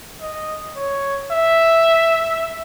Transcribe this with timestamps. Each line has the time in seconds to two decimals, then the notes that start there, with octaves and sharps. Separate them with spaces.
0.21 D#5
0.76 C#5
1.32 E5